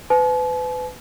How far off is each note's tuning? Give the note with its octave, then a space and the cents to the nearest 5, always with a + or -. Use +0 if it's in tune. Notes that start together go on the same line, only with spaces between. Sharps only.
B4 +30 A5 -45